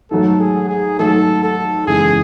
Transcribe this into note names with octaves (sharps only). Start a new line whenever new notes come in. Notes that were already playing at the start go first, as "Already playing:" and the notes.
G#2 F#3 A3 A4
G#4
G#4
G#2 F#3 A3 A4
A4
F#1 E2 C#3 E3 G#3 G#4